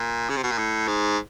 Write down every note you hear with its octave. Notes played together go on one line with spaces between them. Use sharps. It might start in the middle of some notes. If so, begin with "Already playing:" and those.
Already playing: A#2
C#3
C3
B2
A#2
A2
G#2